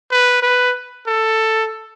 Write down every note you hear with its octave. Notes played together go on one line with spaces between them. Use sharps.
B4
B4
A4